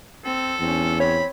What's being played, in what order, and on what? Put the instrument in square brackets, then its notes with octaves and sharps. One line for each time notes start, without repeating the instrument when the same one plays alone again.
[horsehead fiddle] C4 [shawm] A4
[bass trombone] E2 [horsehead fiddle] C4 C#4
[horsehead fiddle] C4 [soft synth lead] C#5 [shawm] B5